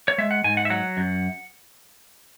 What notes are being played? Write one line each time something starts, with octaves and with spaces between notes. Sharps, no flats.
C#5
G#3 E5
F#5
G#2 G#5
F#5
E5
F#3 F#5
F#2